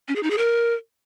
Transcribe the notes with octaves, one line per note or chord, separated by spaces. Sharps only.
C#4
G#4
D#4
G#4
A#4